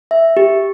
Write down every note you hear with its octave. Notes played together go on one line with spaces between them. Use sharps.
E5
G4